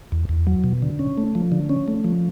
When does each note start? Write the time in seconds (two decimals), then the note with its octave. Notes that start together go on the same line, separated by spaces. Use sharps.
0.12 E2
0.29 E2
0.47 F#3
0.64 B2
0.82 D3
0.99 C#4
1.18 A3
1.35 F3
1.52 D3
1.69 C#4
1.88 A3
2.04 F3